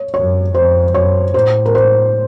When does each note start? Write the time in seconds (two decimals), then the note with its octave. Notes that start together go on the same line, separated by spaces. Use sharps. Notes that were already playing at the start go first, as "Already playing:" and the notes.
Already playing: C#5
0.14 F#2 C#5
0.54 F2 C5
0.94 F#2 C#5
1.34 A2 C5
1.66 A#4
1.75 C5